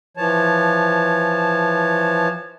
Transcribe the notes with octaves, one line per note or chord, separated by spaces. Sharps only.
E3 F3 C#5 A5